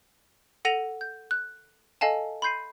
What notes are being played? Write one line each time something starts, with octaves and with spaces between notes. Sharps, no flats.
A4 F#5 A#6 D#7 F7 F#7
G6
F#6
A4 D#5 F5 G#5 A5
B5 C6 G6 C7 D#7